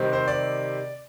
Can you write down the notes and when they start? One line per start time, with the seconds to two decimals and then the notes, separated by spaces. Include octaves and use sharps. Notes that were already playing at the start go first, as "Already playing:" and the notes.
Already playing: C3 D#3 G3 C4
0.13 C5
0.28 D5